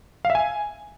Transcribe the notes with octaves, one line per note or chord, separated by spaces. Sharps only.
F5
E5
G#5